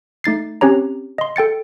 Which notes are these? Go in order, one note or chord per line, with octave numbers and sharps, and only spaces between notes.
A3 D#4 A6 C7
C4 C#4 G4 C#5 A#5
D#5 C6
A4 G5 A6 C#7